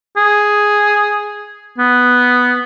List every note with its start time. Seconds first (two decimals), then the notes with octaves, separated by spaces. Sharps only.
0.17 G#4
1.78 B3